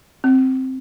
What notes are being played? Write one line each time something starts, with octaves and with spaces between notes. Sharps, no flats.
C4